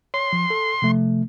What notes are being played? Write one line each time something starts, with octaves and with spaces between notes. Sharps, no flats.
C#5 C6
F3
A4
C3 F3 A3